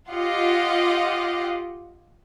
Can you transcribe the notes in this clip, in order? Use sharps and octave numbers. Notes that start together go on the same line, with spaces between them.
F4 G4 D#5 F5 F#5